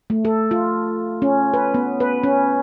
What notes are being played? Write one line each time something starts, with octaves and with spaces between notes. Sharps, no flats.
A3
A4
F4
C#4
B4
B3
B4
C#4